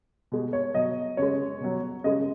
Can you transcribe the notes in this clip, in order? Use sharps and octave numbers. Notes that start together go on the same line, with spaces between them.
B2 G#3
C#5
B2 F#3 D#5
C#3 G#3 C#5
B2 F#3
C#3 G#3 D#5